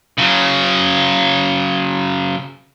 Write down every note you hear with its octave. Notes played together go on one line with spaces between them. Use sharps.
C#3 F#3